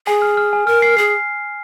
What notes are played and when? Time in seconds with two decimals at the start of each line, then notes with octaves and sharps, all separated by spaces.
0.07 G#4 G#5
0.22 F6
0.37 F6
0.53 G#5
0.67 A#4 F6
0.82 C7
0.97 G#4 C7